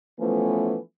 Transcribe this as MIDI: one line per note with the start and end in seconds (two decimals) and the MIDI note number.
0.19 0.77 52
0.19 0.77 53
0.19 0.77 57
0.19 0.77 59
0.19 0.77 61